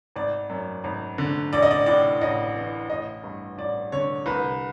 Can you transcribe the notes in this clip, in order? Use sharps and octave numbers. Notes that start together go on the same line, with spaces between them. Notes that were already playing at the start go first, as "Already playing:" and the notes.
G#1 D5
F#2
G#1
D3
A1 D5
D#5
D5
A2 D5
A1 D#5
E3
A1 D#5
G2
A1 D5
D3 C#5
C2 B4